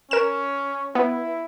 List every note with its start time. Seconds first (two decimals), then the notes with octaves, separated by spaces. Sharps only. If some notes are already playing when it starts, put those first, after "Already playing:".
0.11 C#4 A#4 E7
0.95 B3 E4